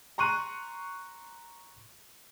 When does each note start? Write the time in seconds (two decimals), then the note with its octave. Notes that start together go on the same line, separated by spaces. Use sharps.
0.18 A#5 C6 C#6 F#6 D#7